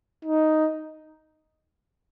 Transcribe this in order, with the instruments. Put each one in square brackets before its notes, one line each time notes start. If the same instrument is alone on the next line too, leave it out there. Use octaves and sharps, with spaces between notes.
[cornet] D#4